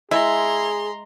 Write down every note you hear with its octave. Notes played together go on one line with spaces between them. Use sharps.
G#3 E4 G#4 A#5 C6